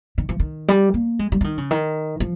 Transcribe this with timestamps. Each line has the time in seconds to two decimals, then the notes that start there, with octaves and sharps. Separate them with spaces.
0.18 D#3
0.29 F3
0.40 D#3
0.68 G3
0.94 A#3
1.19 G#3
1.32 G3
1.41 F3
1.44 D#3
1.58 C#3
1.71 D#3
2.20 F3